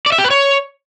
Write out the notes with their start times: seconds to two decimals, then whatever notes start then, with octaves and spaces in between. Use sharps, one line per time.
0.06 D5
0.12 E5
0.18 G4
0.24 B4
0.30 C#5